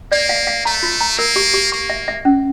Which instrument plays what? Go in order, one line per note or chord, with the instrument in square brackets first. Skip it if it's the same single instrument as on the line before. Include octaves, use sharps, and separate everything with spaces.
[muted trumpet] A#3 [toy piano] D5
[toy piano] F5
F5
[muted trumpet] A3 [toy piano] A#5
[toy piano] F4
A#5
[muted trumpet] A#3 [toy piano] A#4
[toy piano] G4
G4
[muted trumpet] A#3 [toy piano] C#6
[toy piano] E5
E5
C#4